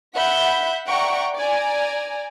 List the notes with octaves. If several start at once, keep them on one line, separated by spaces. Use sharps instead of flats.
E5 F#5 B5 G6 B6
D5 E5 F#5 G5 A#5 C#6
D5 G#5 A#5